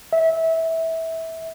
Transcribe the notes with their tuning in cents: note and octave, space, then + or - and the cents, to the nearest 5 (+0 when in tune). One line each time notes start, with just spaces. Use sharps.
E5 -20